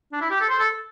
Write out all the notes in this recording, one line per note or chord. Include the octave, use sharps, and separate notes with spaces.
D4
E4
G4
A4
C5
A4